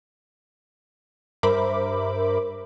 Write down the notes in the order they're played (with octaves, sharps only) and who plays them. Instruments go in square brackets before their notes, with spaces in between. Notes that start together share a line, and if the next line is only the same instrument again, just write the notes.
[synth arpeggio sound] G2 A#4 C5 E5 B5 D6